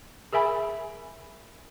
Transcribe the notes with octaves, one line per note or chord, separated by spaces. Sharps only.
G#4 A#4 E5 G#5 B5